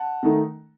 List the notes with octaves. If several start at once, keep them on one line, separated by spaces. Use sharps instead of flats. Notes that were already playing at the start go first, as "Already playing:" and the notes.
Already playing: F#5 A5
D#3 A3 D#4